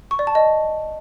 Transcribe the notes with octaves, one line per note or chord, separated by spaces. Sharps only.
C#6
D5
A5
D#5